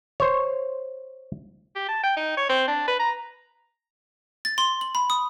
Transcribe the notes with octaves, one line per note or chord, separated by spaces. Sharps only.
C5 C#5
G4
A5
G5
D#4
C#5
C4
D4
B4
A#5
A6
C6
F#7
B5
D#6